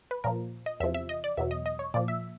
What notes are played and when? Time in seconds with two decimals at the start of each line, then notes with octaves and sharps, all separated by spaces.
0.11 B4
0.24 A#2 F3 A#4
0.66 D#5
0.80 E2 E5
0.83 C3 F3
0.94 E5
1.09 D#5
1.24 D5
1.37 E2 B2 F#3 E5
1.51 D#5
1.66 D#5
1.79 C#5
1.94 A#2 F3 D5
2.08 E5